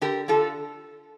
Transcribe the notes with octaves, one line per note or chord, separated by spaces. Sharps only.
D3 G4 A#4
D3 F4 A4